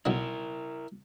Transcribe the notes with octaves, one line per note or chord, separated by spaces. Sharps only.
B1 F#3 D#4 E4 A#4